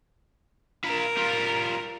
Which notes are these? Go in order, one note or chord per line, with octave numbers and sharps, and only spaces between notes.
F4 A#4 B5
G3 F4